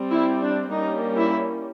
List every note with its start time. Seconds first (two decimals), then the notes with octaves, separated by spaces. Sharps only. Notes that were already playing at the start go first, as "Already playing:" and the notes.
Already playing: G3 C4
0.11 E4
0.42 D4
0.71 G3 A#3 C#4 D#4
1.17 E4